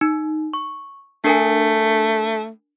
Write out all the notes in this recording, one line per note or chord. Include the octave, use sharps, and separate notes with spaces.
D#4
C#6
A3 D4 A#4 G#5